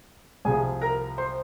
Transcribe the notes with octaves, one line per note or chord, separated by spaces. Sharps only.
C2 C3 F3 G#4 G#5
A#4 A#5
C5 C6